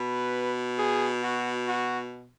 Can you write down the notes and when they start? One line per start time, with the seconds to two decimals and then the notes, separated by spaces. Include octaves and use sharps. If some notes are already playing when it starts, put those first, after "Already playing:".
Already playing: B2 B4
0.78 G#4
1.23 F#4
1.68 F#4